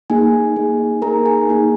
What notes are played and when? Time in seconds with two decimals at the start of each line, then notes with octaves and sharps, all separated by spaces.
0.10 A#3 D#4 G#4 G#5
0.56 A#3 D#4 G#4
1.02 A#3 D#4 G#4 A#4 A#5
1.26 G#4 G#5
1.49 A#3 D#4 G#4